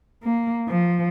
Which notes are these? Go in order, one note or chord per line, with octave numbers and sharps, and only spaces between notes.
A#3
F3